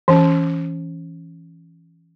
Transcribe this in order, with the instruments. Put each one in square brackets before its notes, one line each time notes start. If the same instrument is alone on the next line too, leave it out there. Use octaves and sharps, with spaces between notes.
[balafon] E3 C#4